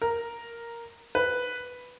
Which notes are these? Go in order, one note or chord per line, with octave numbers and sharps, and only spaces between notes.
A#4
B4